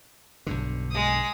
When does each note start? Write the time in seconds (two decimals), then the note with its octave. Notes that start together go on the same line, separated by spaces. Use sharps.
0.47 B1 G2 D3
0.91 G#3 D#6